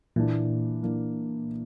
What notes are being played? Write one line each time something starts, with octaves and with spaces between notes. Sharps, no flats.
A#2 E3 A#3 D4
E3 A#3 D4